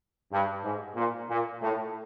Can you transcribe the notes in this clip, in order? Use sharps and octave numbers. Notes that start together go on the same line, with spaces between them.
G2
G#2
A#2
A#2
A2